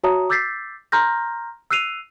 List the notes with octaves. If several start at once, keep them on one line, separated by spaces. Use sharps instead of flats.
F#4 C#5 E5 A5 A#5 D#6
D6 E6 G6 A6 B6 C7
A#5 C6 F6 G6 A#6
E6 F#6 C7 D#7 F7